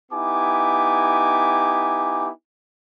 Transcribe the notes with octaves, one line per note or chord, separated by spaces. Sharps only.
B3 D#4 E4 G4 G#5 D6